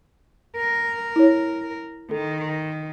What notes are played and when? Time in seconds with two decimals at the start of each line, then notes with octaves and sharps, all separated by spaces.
0.57 A#4
1.16 E4 C#5
2.11 D#3 A4